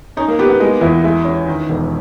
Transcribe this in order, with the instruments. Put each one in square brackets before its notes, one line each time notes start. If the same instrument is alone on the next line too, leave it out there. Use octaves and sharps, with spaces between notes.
[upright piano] C#4 [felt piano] D#4
[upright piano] A#3
[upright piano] B3 [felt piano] G4
[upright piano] B3
[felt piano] G#3 [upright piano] D#4
[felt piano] E2 [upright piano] E4
[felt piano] G#3 [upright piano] E4
[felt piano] C#4
D#3
E1